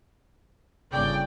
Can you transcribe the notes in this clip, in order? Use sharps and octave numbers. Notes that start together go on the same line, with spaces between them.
G1 C#3 D5 G5